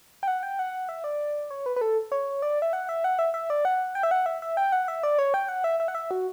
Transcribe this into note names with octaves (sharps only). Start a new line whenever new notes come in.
G5
F#5
G5
F#5
E5
D5
C#5
B4
B4
A4
C#5
D5
E5
F#5
E5
F#5
E5
E5
D5
F#5
G5
E5
F#5
E5
E5
G5
F#5
E5
D5
C#5
G5
F#5
E5
E5
F#5
E5
F#4